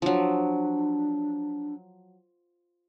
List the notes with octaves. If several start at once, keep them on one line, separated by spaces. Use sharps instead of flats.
F3 F#3 D4